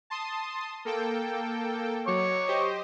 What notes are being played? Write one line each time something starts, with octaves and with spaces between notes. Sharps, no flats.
A5 C6 D#6
A#3 A4 G5
F#3 C#5 C#6 D6
G4 C5 D#5